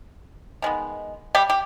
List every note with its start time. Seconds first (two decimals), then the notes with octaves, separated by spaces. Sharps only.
0.62 D#3 G#3 B3
1.35 G3 G4
1.50 G4